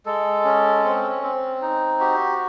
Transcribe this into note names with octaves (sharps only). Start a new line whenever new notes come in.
G#3 A4
C#4
C4
C4
D#4
F#4 G4